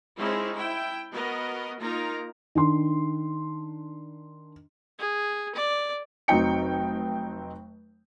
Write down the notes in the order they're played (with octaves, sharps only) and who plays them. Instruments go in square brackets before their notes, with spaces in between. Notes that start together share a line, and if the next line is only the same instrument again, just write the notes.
[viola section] G#3 C4 C#4 D#4 E4 G#4
E4 G5
B3 F#4 A#4 D#5
A#3 D#4 F4 A#4 A#5
[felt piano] D#3 D4 C6
[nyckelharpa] G#4
D5
[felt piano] F1 F#3 C4 D#4 G5 C#7